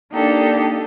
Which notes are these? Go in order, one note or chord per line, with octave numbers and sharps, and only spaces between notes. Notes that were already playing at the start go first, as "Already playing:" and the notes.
A#3 D4 D#4 G4 A4